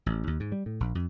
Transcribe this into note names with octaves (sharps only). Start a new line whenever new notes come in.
A1
D#2
G#2
G3
A2
A#1
F2